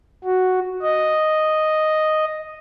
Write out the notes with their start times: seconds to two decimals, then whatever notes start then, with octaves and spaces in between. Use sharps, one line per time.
0.24 F#4
0.82 D#5